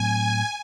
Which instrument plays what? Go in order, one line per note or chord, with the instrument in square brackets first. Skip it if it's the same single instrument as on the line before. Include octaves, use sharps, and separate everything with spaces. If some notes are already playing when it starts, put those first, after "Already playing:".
Already playing: [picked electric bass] A2 F#3 A3 C4 [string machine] G#5